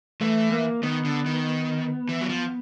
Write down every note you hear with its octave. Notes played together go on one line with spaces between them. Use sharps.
E3 A3
A#3
D#3 B3
D3
D#3
E3
F#3
F3